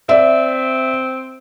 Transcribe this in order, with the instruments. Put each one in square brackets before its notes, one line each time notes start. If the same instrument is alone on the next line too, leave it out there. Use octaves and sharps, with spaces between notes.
[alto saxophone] C4 [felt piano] D5 E5